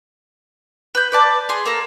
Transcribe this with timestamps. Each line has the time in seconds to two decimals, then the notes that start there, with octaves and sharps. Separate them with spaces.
0.95 B4 G6
1.12 B4 D5 A5
1.49 G#4 C6
1.66 A#3 A4 A#5